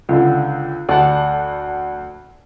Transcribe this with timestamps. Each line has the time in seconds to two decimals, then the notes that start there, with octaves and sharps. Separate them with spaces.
0.09 C#2 D3
0.89 D2 D5 F#5 A5